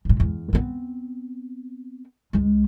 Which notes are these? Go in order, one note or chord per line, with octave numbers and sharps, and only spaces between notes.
A#1 G#2
E2
B3 C4
C#2 G#3